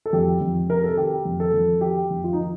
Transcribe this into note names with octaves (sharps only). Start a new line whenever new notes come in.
A4
F2 G4
F2
C3 A#4
A4
D#3 G4
F2
A4
F2
D#3 G4
F2
F4
D#4
D#3